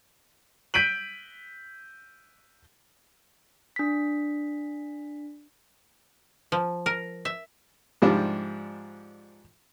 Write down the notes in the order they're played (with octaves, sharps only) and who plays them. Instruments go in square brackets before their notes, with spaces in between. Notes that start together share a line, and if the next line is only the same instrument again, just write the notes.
[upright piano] G6 B6 D7 D#7 F#7
[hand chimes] D4 B6
[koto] F3
A#4
E5
[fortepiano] G#2 C3 F3 G3 D4